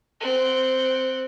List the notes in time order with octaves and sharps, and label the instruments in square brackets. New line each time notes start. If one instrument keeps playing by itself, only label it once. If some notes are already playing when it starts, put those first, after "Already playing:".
[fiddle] C4 F#5